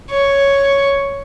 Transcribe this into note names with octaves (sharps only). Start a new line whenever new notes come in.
C#5